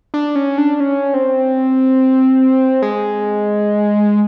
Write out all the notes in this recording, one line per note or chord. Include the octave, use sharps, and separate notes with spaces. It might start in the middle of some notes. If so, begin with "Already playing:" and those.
D4
C#4
D4
C#4
C4
G#3